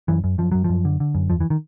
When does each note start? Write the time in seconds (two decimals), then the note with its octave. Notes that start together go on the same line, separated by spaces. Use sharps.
0.08 F#2 E3
0.24 F#2
0.38 F#2 F3
0.52 F#2 F#3
0.64 F#2 F3
0.85 D3
1.00 D3
1.15 F#2
1.30 E2 F3
1.41 E3
1.50 D#3